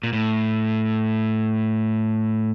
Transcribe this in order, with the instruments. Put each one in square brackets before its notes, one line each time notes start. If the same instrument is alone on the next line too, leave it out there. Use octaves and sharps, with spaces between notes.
[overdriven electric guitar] A#2
A2